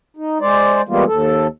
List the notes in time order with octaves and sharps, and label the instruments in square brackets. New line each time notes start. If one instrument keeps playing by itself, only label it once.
[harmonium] D#4
G#3 C5 D5
E3 G3 G#3 A#3 B3 F4
D#2 A4